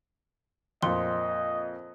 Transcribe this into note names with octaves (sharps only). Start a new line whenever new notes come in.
F2 A#2 D#5 C6